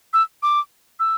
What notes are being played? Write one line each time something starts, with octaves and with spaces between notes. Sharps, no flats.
E6
D6
E6